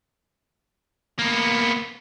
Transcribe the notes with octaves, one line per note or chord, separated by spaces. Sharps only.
A#3 B3